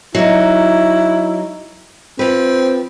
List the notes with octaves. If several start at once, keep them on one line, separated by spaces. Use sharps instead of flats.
F#3 D#4 E4
F3 C4 B4